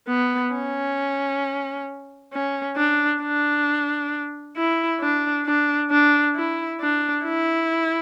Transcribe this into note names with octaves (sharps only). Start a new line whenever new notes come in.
B3
C#4
C#4
D4
D4
E4
D4
D4
D4
E4
D4
E4